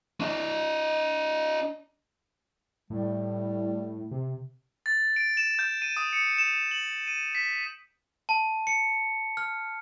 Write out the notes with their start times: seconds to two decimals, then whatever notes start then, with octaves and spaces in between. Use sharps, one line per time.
0.21 D4 D#5
2.90 A2 G3
4.11 C3
4.86 A6
5.16 D7
5.37 E7
5.59 G6
5.82 D#7
5.97 D#6
6.13 C#7
6.38 E7
6.71 F#7
7.07 D#7
7.35 B6
8.29 A5
8.67 C#7
9.37 F6